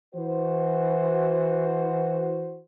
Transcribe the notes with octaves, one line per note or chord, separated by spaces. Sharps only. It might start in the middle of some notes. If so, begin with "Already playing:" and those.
E3 F#4 C5